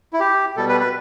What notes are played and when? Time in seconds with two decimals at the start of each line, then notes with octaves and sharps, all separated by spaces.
0.13 E4
0.20 G4
0.57 B2 G3 A4
0.69 B4
0.81 B4